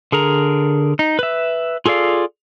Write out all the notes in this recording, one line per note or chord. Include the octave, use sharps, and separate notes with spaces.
D3 G#4 A#4 A#5
D#4
B4 E5
F4 G#4 A4 D5 F5